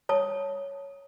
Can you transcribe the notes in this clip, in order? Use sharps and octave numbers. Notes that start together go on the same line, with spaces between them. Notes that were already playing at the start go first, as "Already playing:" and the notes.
C#5 A5 D#6